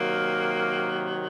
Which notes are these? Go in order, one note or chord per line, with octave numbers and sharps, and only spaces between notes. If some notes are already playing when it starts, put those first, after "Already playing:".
Already playing: C3 D#3 F#3 A#3